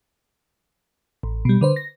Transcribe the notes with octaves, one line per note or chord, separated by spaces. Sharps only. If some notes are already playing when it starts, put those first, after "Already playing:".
A1
B2 G3
D3 B4 C5
A#6